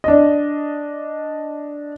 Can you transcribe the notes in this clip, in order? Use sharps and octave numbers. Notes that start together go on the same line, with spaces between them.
D4 D#5